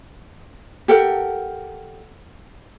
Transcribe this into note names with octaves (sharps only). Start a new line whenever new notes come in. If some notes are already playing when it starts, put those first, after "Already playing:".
G4 A4 A#4 F#5